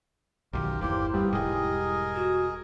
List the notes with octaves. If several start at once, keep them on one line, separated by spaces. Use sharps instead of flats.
B1 F#2 D#3 F4 G4 A#4
G1 E2 A#3 E4 G4 C5
G3 B3 C4 F4
E1 G#2 G#4 A#4 D#5
F#4